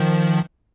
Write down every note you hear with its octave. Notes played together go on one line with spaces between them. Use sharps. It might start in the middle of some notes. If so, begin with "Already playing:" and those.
Already playing: D#3 F3